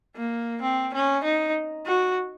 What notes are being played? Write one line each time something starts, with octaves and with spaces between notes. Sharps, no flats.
A#3
C4
C#4
D#4
F#4